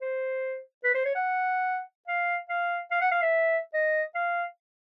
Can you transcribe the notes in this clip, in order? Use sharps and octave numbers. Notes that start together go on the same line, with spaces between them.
C5
B4
C5
C#5
F#5
F5
F5
F5
F#5
F5
E5
D#5
F5